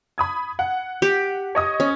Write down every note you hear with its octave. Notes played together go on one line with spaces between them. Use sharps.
B5 D#6 G#6
F#5
G4
C#5 D#5 D#6
C#4